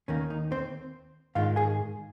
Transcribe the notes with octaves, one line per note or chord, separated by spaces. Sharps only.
D#2 D#3 A#3 C#4
D#4
C4 C5
G#2 D#3 G#3 F4 F5
G#4 G#5